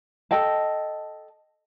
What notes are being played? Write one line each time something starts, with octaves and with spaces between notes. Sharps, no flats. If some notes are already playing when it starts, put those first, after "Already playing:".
A4 D#5 G5 A5